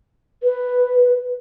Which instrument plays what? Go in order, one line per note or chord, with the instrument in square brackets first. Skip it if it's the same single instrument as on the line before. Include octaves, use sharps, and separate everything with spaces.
[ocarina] B4